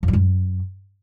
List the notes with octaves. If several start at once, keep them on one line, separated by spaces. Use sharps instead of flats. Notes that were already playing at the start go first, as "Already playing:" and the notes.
F2
G3
F#2